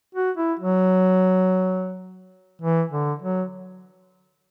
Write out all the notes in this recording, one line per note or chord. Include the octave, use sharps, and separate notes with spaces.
F#4
E4
F#3
E3
D3
F#3